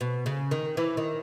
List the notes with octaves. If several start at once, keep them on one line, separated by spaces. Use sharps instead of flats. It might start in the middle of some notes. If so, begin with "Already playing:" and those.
B2
C#3
D#3
E3
D#3